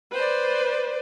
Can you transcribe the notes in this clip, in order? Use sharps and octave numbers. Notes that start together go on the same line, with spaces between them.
B4 C5 D5